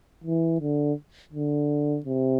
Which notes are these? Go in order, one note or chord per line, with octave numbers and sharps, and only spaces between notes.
E3
D3
D3
C3